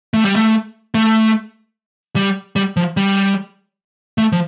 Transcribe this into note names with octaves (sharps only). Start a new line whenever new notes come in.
A3
G3
A3
A3
G3
G3
F3
G3
A3
F3